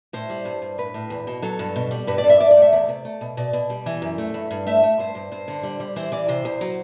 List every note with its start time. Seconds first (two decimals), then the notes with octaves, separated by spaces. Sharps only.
0.13 A2 C5
0.30 G3
0.45 G2
0.62 G2
0.78 A2 B4
0.94 A2
1.10 E2
1.27 B2
1.42 F#3 A4
1.59 G2
1.76 B2
1.91 G3
2.07 G2 B4
2.18 D5
2.24 G2
2.29 E5
2.40 G2 D5
2.51 D5
2.56 A3
2.62 E5
2.72 E2 D5
2.89 C3
3.05 A3
3.21 B2
3.37 B2 D5
3.53 B2
3.70 G3
3.86 E3
4.02 F#2
4.18 A3
4.34 G2
4.51 G2
4.67 A3 E5
4.83 A3
4.99 G2 C5
5.15 G2
5.32 G2 C5
5.48 D3
5.63 G3
5.80 G3
5.96 E3 C5
6.12 E3 D5
6.28 C3 C5
6.45 E2
6.61 F#3